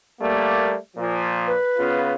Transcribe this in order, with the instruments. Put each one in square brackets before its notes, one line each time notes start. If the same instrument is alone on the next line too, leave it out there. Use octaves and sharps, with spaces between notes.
[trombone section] G3 A3 A#3
A#2 F3
[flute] B4
[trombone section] C#3 B3 F4